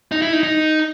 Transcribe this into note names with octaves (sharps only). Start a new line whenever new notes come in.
D#4
E4
D#4
D#4